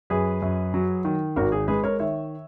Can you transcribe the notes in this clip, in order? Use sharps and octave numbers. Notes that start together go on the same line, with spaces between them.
F#2 G#4 B4
F#2
F#3
D#3
G#1 F#4 A#4
G#4
G#3 G#4 B4
A#4 C#5
D#3 C#5 E5